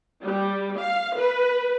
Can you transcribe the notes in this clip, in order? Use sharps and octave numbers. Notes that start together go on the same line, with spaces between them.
G3
F5
B4